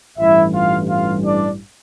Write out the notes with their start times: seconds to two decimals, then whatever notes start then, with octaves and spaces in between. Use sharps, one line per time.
0.18 A1 G2 E3 G3 E4 E5
0.54 F4 F5
0.89 F4 F5
1.24 D4 D5